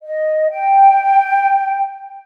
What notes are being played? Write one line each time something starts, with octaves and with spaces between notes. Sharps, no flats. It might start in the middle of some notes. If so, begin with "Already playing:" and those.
D#5
G5